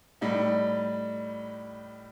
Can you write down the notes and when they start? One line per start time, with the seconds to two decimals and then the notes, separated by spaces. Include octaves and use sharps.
0.21 A2 G3 D#4